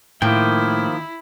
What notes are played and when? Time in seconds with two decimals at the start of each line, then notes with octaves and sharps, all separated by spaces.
0.22 A2 D#3 F3 A#3 E4 G5